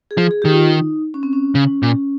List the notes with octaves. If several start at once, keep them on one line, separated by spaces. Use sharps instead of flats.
G#4
F3
G#4
D#3 G4
F4
D#4
C#4
C4
C#4
C#3
A#2